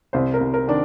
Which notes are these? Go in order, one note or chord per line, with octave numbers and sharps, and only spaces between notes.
C2 C5
A#4
C2
A#4
D#3 D4